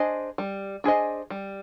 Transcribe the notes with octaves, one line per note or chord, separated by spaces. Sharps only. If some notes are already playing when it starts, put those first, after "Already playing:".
Already playing: D4 G#4 C5 D#5
G3
D4 G#4 C5 D#5
G3